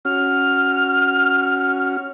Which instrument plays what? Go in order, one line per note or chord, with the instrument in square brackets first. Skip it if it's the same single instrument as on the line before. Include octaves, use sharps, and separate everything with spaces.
[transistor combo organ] C#4 F#4 [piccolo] F6